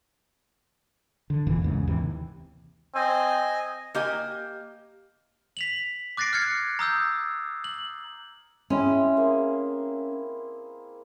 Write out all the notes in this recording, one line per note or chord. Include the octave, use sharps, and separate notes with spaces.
D3
F#1 F2 A#2 E3
A1 E2 G#2 C#3
D#2 C3 E3
C4 D#5 G#5
A#3 G4 D#5 G#5
B6 F7 F#7
D6 F#6 A6 A#6 C7 D7
F6 F#6 G#6 C#7
A#5 D#6 E6 G6
F#7
G#3 C4 C#4 E4
A#3 G#4